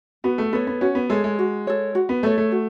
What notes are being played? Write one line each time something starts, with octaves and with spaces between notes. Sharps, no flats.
B3 F#4
A3
B3 A4 C#5
B3
C#4 F#4
B3
G#3 A4 C#5
G#3
F#4
A4 C#5
F#4
B3
A3 A4 C#5
A3
F#4